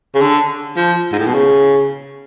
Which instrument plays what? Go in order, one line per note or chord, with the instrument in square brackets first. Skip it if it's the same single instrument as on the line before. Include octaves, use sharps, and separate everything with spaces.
[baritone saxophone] C#3
D3
F3
G#2
A2
B2
C#3